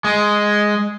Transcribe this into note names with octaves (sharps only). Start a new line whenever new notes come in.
G#3